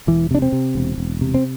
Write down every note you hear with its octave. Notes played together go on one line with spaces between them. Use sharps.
E1 E3
C3 D4
C4
C3
E1
E1
C3
C4